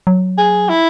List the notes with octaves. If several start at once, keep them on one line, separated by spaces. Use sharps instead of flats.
F#3
G#4
E4